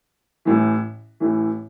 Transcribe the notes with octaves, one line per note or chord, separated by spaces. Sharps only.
A1 A2 E3
A1 A2 E3